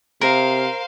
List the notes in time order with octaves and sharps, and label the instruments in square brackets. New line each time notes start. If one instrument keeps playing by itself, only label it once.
[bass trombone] C3 [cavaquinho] A#4 [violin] C5 F5